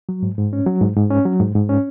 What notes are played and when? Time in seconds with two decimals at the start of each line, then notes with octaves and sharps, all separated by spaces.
0.09 F#3
0.23 G#2
0.38 G#2
0.53 C#4
0.66 F#3
0.81 G#2
0.96 G#2
1.10 C#4
1.25 F#3
1.40 G#2
1.55 G#2
1.69 C#4